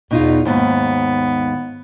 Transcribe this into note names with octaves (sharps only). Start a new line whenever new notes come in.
E2 B2 D#4 F4
D#2 G#2 B3